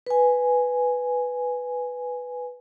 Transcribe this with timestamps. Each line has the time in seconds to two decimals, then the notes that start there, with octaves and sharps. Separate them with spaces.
0.07 B4 G#5